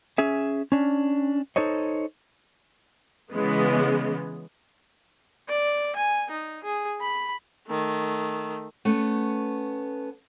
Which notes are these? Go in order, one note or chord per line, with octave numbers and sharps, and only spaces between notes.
C#4 G#4 E5
C#4 D4
D#4 A4 C5 C#5 D#5
C#3 E3 G#3 B3
D5
G#5
D#4
G#4
B5
D#3 A3
A3 B3 C#4